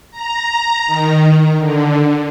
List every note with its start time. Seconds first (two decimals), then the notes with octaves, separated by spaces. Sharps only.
0.11 A#5
0.87 D#3
1.58 D3